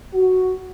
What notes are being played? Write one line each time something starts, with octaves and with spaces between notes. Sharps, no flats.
F#4